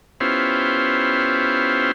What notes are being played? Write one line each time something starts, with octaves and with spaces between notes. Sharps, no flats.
B3 C#4 E4 F4 G4 C5